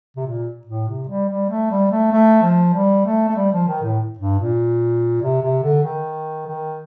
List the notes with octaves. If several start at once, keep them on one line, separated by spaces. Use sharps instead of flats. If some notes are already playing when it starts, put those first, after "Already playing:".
C3
A#2
A2
C3
G3
G3
A3
G3
A3
A3
F3
G3
A3
A3
G3
F3
D#3
A2
G2
A#2
C3
C3
D3
D#3
D#3